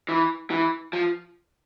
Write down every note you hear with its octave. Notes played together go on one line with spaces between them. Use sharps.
E3
E3
F3